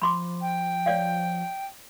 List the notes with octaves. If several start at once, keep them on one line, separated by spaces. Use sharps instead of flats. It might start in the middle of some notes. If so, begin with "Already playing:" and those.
F3 B5 C6 D6
G5
C#5 D5 F5